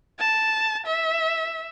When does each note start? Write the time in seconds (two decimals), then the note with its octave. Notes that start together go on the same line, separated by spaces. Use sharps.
0.19 A5
0.86 E5